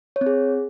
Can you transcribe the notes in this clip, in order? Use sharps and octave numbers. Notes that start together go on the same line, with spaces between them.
C#5
C4
G#4